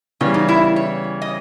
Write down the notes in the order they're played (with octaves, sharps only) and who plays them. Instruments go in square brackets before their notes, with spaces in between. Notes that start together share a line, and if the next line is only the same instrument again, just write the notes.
[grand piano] C#3 E3 G3 B3 [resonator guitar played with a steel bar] C#4
[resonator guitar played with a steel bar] D#4
E4
C#5
D#5